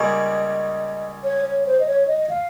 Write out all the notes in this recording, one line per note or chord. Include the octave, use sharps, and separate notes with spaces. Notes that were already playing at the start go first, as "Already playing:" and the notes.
Already playing: C#2 C#3 G3 A#3 D#5
C#5
C#5
C5
D#5
C#5
D#5
F5